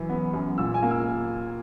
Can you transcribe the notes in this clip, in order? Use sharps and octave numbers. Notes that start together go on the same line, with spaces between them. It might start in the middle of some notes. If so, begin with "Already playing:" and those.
Already playing: F#2 E3
B3
F#2
A#2 E6
G#5
A#3
E6